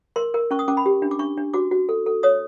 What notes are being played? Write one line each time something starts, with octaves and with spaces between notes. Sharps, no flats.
A#4 C6
A#4
C#4 C#6
D#6
C#4 D6
B5
G4
D4
D6
D4 C#6
D4
F#4 D6
F#4
A4
A4
C#5 D#6